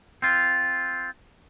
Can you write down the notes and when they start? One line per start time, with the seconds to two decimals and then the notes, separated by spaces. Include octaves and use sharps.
0.22 C4 F4